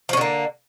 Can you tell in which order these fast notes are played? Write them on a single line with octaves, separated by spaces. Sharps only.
F3 C#4 D3 A#3